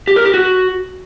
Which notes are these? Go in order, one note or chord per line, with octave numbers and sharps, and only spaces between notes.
G4
A#4
G4
F#4